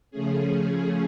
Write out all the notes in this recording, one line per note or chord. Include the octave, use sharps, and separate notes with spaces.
C#3 F3 A3 C#4 G#4